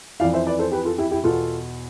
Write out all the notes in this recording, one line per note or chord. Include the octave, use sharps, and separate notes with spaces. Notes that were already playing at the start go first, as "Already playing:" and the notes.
F2 E3 D5 F5
C5 E5
B4 D5
A4 C5
G4 B4
F4 A4
E4 G4
E4 G4
E2 B2 F4 A4